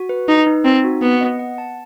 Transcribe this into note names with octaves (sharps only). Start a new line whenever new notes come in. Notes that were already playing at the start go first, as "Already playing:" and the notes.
Already playing: F#4
B4
D#4 B4
D#4
C4 D#4
F#4
B3 F#5
D#5
F#5
A5